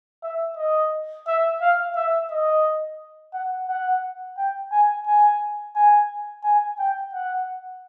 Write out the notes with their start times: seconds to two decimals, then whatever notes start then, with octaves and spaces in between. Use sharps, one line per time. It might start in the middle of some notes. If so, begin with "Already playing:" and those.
0.23 E5
0.57 D#5
1.27 E5
1.61 F5
1.95 E5
2.31 D#5
3.34 F#5
3.68 F#5
4.37 G5
4.72 G#5
5.06 G#5
5.75 G#5
6.44 G#5
6.79 G5
7.13 F#5